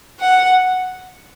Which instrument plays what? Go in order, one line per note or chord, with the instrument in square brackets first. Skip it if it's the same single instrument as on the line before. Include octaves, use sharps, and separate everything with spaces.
[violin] F#5